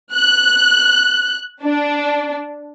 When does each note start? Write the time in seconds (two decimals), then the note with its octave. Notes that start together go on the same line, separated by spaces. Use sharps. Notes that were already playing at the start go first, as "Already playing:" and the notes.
0.15 F#6
1.62 D4